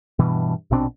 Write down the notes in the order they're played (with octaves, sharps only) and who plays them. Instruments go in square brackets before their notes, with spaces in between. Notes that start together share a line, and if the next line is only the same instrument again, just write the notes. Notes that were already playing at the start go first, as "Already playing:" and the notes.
[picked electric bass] G2 B2 E3
A#1 B2 C4 D4